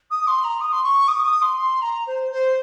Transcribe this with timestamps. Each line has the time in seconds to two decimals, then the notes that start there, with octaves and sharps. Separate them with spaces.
0.10 D#6
0.27 C6
0.43 A#5
0.60 D#6
0.72 C6
0.83 C#6
1.07 D#6
1.20 C#6
1.24 D#6
1.41 C6
1.57 C6
1.81 A#5
2.06 C5
2.31 C5